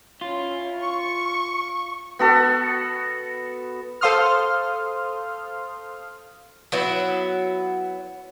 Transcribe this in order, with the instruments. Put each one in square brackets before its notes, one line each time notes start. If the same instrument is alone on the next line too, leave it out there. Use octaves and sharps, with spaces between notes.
[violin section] C#4 E4 [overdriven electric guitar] F4
[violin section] C#6
[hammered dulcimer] B3 F#4 A4
[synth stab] A4 C5 F5 C6 D#6 F6
[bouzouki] F#3 B3 E4